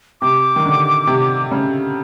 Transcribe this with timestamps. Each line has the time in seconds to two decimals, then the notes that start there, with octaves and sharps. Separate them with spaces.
0.21 C3 D6
0.56 D#3
0.65 D3
1.07 C3
1.52 C#3